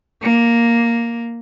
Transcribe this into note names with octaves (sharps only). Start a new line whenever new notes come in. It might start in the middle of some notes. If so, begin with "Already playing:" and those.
A#3